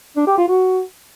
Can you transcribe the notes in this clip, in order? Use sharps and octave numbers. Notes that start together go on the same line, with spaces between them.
D4
G4
F4
F#4